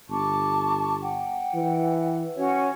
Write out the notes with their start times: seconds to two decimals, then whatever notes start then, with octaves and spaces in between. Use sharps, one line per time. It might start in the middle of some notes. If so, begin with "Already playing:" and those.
0.10 G1 A5 C#6 D6
1.02 F#5 G5
1.55 E3
2.36 C#4 F#4 C#5